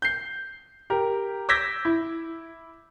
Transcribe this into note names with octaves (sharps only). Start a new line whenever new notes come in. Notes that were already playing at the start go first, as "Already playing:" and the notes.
G6 C7
G4 A#4
D6 E6 G6 G#6 A#6 B6
E4